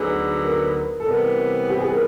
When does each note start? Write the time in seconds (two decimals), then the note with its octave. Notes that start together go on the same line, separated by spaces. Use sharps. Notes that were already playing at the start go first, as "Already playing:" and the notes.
Already playing: D2 D3 F#3 B3 D#4 G#4
0.42 A#4
1.00 A4
1.06 C3 E3 G3 B3 A#4
1.70 G4
1.80 G#4
1.91 A#4